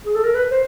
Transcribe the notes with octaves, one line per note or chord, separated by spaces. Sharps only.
G#4
A4
A#4
B4
C5